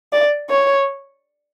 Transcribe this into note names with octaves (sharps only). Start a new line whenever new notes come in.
D5
C#5